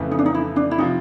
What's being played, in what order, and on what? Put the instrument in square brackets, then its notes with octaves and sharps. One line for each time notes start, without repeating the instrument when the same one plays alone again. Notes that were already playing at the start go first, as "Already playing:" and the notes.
Already playing: [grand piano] F2 C#3 E3 A3
[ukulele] D#4
D4
D#4
E4
D4
E4
[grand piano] C3 F3 [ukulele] D#4